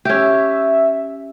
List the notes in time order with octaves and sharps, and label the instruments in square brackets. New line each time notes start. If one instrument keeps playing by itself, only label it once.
[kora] C#4 G4 [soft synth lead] E5